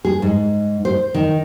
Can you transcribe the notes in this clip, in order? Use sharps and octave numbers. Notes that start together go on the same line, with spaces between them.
G#4
G#2
C5
D#3